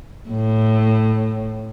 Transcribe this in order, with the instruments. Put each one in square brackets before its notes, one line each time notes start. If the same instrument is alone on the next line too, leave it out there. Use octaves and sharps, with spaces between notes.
[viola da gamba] A2